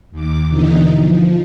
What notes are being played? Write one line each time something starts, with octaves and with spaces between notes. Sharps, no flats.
D#2 D6
B2 D3 E3 D#4
F3